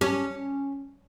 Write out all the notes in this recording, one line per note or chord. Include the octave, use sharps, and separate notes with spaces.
C#4 G4